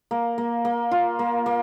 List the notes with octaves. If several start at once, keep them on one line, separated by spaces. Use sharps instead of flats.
A#3
A#3
A#3
F4
A#3
A#3